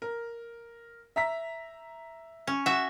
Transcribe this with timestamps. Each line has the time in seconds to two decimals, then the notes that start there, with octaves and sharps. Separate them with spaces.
0.02 A#4
1.16 E5 A#5 B6
2.47 C#4
2.66 F#4 E5 F#5